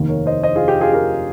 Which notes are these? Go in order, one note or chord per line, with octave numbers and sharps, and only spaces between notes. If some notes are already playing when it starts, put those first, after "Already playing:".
Already playing: F1 D#2 D#3 A#3
A#4 C#5
C5 D#5
C5 D#5
F4 G#4
G4
F4 G#4
G4 A#4